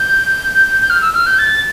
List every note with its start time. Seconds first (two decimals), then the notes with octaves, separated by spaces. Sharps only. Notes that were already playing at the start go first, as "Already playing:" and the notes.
Already playing: G6
0.81 G6
0.90 F6
1.02 E6
1.14 F6
1.26 G6
1.39 A6